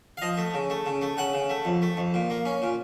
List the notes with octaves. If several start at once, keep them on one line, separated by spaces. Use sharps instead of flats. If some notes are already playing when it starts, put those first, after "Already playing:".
F5
F3 D#5
A3
C#3
A3
C#3
A3
C#3 F#5
C#3
A3
F2
A3
F2
A#2
A#3
C#4
A#2